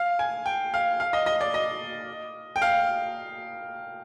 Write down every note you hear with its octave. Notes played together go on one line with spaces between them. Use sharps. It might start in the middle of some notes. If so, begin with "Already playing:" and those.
Already playing: F5
G#5
G5
F5
F5
D#5
D#5
D5
D#5
G5
F5